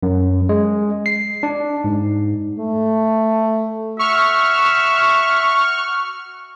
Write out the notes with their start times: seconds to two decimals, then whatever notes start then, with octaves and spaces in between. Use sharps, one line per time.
0.03 F#2
0.49 G#3
1.06 C7
1.43 D4
1.84 G#2
2.60 A3
3.99 F#4 E5 C#6 F6